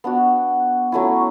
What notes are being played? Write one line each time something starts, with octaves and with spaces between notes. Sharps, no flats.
B3 D4 F#4
F#3 A3 C#4 E4